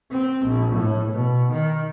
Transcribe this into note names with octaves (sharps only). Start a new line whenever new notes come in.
C4
A#1
A2
B2
D#3